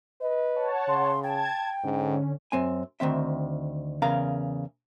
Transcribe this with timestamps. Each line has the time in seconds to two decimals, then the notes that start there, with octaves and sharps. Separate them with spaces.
0.21 B4 D#5
0.56 C#5 F#5 A5
0.88 C#3 C6
1.23 G5 A5 G#6
1.84 G#2 D3 C#4
2.52 F#2 C4 G#5
3.00 D2 D#3 C4 E5
4.02 E2 C#3 A#4 F5 A#5